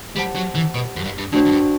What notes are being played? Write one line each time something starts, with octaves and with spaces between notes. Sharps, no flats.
G3 G4 C5 F#5 A5
F#3
E3
B2
F#2
G2
G2
A2 D4 F#4 C5 G5
F#2
G2